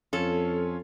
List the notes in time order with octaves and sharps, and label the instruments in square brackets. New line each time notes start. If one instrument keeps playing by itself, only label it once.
[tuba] F2 [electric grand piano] C#4 F4 C#5 [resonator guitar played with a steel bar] A4